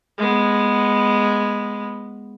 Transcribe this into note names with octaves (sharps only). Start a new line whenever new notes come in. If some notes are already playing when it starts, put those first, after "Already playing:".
G#3 B3